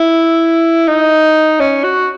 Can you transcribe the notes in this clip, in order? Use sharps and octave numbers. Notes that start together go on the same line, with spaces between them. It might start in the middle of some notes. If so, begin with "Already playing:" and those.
Already playing: E4
D#4
C#4
F#4